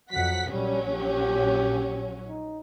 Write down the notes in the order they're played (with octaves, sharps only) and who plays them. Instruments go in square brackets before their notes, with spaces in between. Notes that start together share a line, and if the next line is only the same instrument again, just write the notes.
[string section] F2 F#5 B6 [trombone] F#3
[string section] A#1 F#3 C#4 [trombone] G3
[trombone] G4
D#4